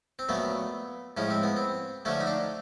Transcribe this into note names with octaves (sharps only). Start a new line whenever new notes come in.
C4
A#2 F#3 A3 B3
A2 F3 G#3 C#4
C4
B3
C4
D3 F3 A3 C#4
D#4
D4